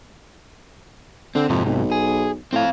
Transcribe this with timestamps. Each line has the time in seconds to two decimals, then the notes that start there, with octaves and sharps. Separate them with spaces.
1.35 D3 C4
1.49 F2 G#2 C3
1.66 B1
1.92 G#4
2.53 A2 C4 F5